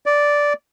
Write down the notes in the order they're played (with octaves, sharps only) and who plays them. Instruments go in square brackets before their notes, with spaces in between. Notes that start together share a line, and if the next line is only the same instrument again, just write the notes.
[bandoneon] D5